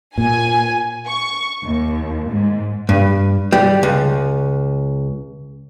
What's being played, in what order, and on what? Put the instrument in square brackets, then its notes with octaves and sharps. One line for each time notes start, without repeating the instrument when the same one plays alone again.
[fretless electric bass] A#2 [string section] G#5
[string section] C#6
D#2
G#2
[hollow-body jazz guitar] G2
G3
C#2